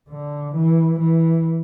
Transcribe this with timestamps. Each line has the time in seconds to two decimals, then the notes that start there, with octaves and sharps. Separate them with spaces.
0.09 D3
0.54 E3
0.99 E3